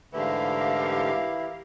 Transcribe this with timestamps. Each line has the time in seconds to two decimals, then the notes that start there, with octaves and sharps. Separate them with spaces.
0.13 G#2 D3 E3 A3 E4 G4 A#4 F5